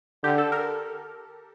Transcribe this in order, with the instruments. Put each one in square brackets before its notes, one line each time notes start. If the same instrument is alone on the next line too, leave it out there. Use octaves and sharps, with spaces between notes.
[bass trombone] D3 [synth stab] G4
[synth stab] A4
A#4